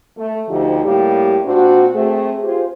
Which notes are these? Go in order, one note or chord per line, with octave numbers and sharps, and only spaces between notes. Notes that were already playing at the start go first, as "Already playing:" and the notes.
A3
D2 D3 F3 D#4 G4
A2 G3 A#3 G4
A#2 C4 D4 F#4
A3 C4 G#4
F4 G4 G#4 C5